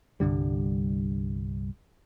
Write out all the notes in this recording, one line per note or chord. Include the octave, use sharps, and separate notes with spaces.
C2 G2 D3 G3